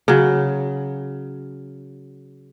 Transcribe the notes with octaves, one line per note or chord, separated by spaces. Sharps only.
C#3 F#3